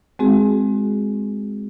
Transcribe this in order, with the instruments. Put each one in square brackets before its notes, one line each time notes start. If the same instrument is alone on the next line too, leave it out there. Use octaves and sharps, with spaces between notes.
[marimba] G#3 C4 F#4 G#4